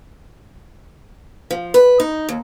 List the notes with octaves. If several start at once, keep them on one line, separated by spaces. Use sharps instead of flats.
F3
B4
D#4
D#2